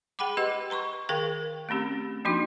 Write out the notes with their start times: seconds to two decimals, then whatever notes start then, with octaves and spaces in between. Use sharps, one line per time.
0.19 G#4 F#5 G5 B5 D6
0.37 G4 B4 D#5 C6
0.70 B4 A#5 C6 C#6
1.09 D#3 G#4 A#4 F5 G5
1.69 A3 C4 C#4 G4
2.25 F3 A#3 D4 D#4 F#4